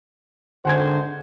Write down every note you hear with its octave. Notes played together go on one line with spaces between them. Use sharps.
G#1 D3 C5 F#5 G#5 G#6